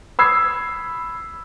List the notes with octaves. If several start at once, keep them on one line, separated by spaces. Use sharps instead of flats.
B5 D#6 E6 G#6 C7